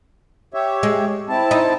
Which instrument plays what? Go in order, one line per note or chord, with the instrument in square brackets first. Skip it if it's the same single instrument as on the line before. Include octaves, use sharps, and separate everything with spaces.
[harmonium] G4 C#5 E5
[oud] G#3
[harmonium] C4 E4 A5
[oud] D#4